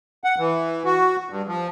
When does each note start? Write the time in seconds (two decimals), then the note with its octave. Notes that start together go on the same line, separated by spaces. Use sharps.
0.24 F#5
0.38 E3
0.85 F#4
1.30 G2
1.47 F3